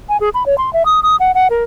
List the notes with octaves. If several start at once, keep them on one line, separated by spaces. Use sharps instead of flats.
G#5
G#4
B5
C#5
C6
E5
D#6
D#6
F#5
F#5
A#4